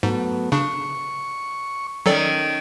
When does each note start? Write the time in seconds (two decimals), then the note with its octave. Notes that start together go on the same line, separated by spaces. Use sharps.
0.03 G#2 F#3 A3 B3
0.52 C#3 D4 C#6
2.06 D#3 F#3 C#4 A4 D5